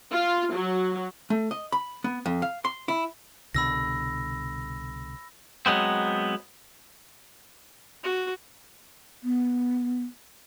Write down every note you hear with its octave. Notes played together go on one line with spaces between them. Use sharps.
F4
F#3
A3
D#5
B5
B3
F2
F5
C6
E4
C2 B2 D3 B5 E6 A#6
F#3 G#3 B3 C4
F#4
B3